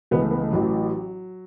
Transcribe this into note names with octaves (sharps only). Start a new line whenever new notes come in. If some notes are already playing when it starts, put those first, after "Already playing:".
C#2 C#3 E3 B3
A3
B3
A3
A1 A2 E3 F#3